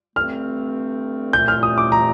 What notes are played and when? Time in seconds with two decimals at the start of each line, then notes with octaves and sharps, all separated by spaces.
0.16 G2 D3 A3 C4 F6
1.33 C2 A#2 A3 G6
1.48 F6
1.63 D#6
1.78 D6
1.92 A#5